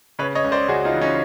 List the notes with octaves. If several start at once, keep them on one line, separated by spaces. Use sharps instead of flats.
C#3 B4 C#5
C#5 D#5
C#2
C5 D5
C#2 F#4 G#4
D#4 F4
E3
C#4 D#4